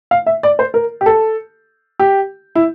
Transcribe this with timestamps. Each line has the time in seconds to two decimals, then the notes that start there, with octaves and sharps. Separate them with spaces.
0.11 F5
0.26 E5
0.43 D5
0.59 C5
0.74 A#4
1.01 G4
1.06 A4
1.99 G4
2.55 E4